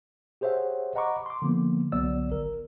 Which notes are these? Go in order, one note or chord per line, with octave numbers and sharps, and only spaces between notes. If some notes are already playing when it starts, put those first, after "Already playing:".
G4 G#4 C5 C#5 E5 F#5
D#5 F#5 A#5 B5 C#6 D6
C6 D6
D3 F3 A#3 B3
C2 D3 F#3 B3 D5 E6
G#1 A#4